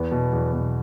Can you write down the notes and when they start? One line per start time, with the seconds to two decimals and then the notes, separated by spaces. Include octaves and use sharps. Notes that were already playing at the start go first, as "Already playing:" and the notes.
Already playing: E2 B3
0.12 B2
0.33 E2
0.53 B2